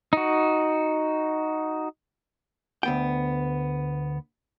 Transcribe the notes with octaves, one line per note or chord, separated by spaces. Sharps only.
D#4 F#4
D2 B3 G5